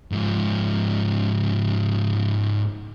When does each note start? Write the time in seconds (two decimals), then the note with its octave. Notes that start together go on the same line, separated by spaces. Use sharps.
0.12 G#2 F3